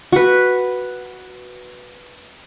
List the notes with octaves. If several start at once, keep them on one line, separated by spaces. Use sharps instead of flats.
F#4 B4